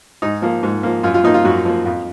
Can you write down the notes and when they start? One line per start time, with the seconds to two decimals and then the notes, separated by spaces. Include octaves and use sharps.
0.22 G#2 D#4
0.42 F3 A#3
0.63 G#2
0.83 F3 A#3
1.03 F#2 F4
1.14 F4
1.24 F3 A#3 D#4
1.34 F4
1.45 F#2 F#4
1.65 F3 A#3
1.85 F2